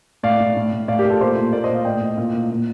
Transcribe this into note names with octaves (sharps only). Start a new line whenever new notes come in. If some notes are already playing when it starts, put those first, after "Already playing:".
A2 D5 F5
A2
A2
A2
A2 D5 F5
G4 A#4
A2
F4 A4
A#2 A4 C5
A#2
A#2 A#4 D5
C5 D#5
A#2
D5 F5
A2 D#5 G5
A2
A#2
A#2
A#2